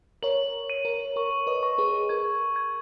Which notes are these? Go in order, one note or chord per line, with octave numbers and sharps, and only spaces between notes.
A#4 C#5 F#7
D#7
A#4
A#4 C#6
B4 D#5
C#6
G#4 B4
A#4 G#6
G#6